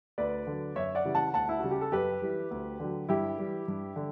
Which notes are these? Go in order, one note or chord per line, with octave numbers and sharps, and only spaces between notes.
D2 B4 D5
D3 F#3
F#2 C#5 E5
D5 F#5
C#3 E3 G3
F#5 A5
D2 F#5 A5
E4
C#3 G3 F#4
G4
A4
F#2 G4 B4
E3 G3
D2
D3 F#3
G2 E4 G4
E3 G3
G2
D3